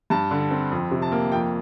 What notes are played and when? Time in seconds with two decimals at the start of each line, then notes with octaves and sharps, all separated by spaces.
0.10 G2 A5
0.31 D3
0.51 C4
0.71 F2
0.91 C3
1.02 A5
1.12 A#3
1.32 F2 G5